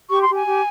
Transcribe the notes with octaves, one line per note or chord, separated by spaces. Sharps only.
G4 C#6
C6
G4
G#5
G4